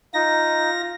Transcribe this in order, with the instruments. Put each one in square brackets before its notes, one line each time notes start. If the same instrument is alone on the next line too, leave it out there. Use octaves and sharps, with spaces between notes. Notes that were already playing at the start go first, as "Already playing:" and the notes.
[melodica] D#4 [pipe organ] F4 A#6